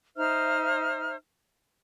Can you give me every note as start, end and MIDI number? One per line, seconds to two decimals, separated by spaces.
0.16 1.16 63
0.16 1.16 72
0.16 1.16 76
0.16 1.16 89